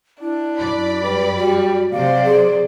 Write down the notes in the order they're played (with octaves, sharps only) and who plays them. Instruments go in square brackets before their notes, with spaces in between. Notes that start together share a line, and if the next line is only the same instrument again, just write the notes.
[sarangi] D4 [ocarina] E4
[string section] F#2 D5 B5
[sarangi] G3 [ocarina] B4
[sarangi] G3 [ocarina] F#4
[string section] C3 F#3 C5 [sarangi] D5 [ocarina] F5
[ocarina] G#4